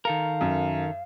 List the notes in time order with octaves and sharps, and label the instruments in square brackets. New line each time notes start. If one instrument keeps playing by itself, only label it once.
[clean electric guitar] D#3 A4 A#4 [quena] F5
[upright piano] F#2